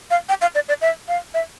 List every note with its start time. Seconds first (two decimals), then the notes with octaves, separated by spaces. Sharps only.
0.11 F5
0.29 G5
0.41 F5
0.55 D5
0.69 D5
0.81 E5
1.08 F5
1.34 E5